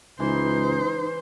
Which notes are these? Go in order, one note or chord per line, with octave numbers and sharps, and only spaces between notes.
C#2 E3 D#4 C5